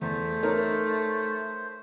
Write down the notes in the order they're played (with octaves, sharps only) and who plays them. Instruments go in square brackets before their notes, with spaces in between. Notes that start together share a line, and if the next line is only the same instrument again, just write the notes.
[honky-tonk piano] E2 [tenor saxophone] A3 [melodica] C5
[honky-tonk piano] D#4 A#4 C#5